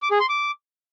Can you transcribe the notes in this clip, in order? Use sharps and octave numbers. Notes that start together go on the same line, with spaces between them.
D6
G#4
C6
D6